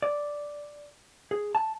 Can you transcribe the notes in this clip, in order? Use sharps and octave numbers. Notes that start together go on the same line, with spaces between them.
D5
G#4
A5